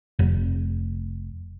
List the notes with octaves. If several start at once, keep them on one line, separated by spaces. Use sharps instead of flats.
F1